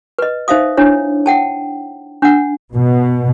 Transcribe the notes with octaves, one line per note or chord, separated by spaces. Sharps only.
B4 D#5
D#4 C5 E5 F5 D#6
D4 E4 C#5
F#5 G5 A5
D4 F#5
B2